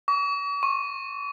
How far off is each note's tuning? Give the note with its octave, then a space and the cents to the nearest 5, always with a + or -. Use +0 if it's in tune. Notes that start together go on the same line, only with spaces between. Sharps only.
C#6 +45
C#6 -30